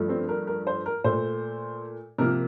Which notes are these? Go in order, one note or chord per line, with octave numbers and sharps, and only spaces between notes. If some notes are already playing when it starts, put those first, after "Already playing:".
Already playing: G2 F3 A3
C4
A#4
A#4
C5
A#4
A#2 A3 C5
C3 F3 A#3 A#4